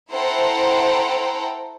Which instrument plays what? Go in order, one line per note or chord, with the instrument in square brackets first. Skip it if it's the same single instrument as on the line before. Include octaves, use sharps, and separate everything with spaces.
[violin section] E4 A4 C5 F#5 G5 A#5